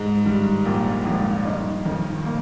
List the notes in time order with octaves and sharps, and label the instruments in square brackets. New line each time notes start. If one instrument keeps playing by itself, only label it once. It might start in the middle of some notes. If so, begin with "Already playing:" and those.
Already playing: [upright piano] G#2 G#3 [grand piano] D#4
[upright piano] G2 G3 [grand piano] D#3
[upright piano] A#1 A#2 [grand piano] A#3
[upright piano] G#1 G#2 [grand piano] F2
[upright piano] G2 [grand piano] D#4
[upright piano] F2 [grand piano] D#3
[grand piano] A#3